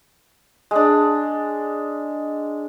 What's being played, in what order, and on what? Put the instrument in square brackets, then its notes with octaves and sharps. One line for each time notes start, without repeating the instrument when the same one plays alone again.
[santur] G#3 D4